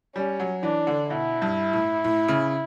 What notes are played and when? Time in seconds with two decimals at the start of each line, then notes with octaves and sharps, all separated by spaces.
0.16 G3 C#4
0.40 F#3
0.63 E3 D4
0.87 D3
1.10 B2 E4
1.42 G2
1.73 A2
2.04 A2
2.28 C#3